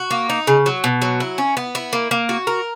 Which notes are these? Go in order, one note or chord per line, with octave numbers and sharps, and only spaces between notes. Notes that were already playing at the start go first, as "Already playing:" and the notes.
Already playing: F#4
A#3
D#4
C#3
F#3
B2
F#3
E4
C#4
B3
E4
A#3
A#3
F#4
A#4